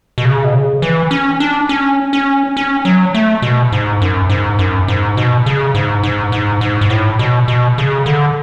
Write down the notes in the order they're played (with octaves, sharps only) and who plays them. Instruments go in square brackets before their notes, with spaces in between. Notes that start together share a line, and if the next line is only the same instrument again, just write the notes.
[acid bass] B2
C#3
B2
C#3
E3
C#4
D4
C#4
C#4
C#4
F#3
A3
B2
G#2
F#2
G#2
F#2
G#2
B2
C#3
G#2
G#2
G#2
G#2
G#2
A2
B2
B2
C#3
D3